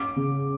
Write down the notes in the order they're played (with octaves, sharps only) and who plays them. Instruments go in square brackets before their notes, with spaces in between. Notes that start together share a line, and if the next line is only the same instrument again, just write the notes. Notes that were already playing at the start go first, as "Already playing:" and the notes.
Already playing: [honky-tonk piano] C#4 [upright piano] D6
[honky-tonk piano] C#3